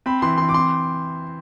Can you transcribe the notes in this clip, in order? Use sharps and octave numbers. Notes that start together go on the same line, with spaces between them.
C4 B5
E3 C6
E3 C6
D6
C4 C6